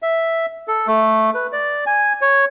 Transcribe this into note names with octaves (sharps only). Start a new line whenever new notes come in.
E5
A4
A3
B4
D5
G#5
C#5